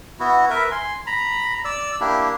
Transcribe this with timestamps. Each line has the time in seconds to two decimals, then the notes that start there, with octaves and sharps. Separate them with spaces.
0.20 B3 E4 F#4
0.50 A#4 B4 E5
0.71 G#5 C6
1.06 A#5 B5
1.65 D5 E6
2.01 A#3 D4 E4 G4